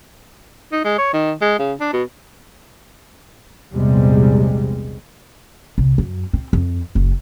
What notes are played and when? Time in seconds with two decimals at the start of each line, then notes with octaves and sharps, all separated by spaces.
0.72 D#4
0.84 G#3
0.98 C#5
1.13 D#3
1.41 G#3
1.59 C#3
1.81 D4
1.93 B2
3.73 A#1 E2 C3 G3 G#3
5.78 C2
5.98 F#2
6.33 C4
6.53 F2
6.95 F#1